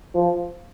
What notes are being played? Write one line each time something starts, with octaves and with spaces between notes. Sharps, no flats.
F3